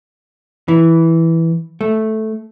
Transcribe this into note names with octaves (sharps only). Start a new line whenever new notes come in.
E3
A3